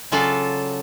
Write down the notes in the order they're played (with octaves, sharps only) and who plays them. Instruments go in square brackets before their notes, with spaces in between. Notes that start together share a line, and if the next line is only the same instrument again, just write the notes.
[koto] C#3 F#3 F4 A4 D5 F5